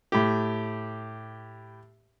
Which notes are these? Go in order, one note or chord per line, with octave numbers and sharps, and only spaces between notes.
A2 G4